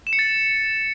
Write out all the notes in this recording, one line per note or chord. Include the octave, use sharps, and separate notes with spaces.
E7
C#7
A6